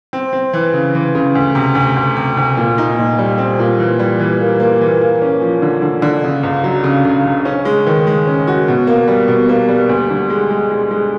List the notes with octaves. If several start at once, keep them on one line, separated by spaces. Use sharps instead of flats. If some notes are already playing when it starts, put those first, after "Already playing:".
C4
C4
E3
C#3
E3
C#3
D2
C3
D2
D2
C3
D2
A#2
D#4
A#2
G3
C4
A#2
E3
G3
E3
A#3
A#3
E3
A#3
C#4
F3
D3
D3
D3
C#3
C#2
F#3
C#3
C#3
C#3
C#4
G#3
D#3
G#3
C#4
F#4
B2
A#3
G3
B2
A#3
G3
D2
D3
G#3
G#3
G#3
G#3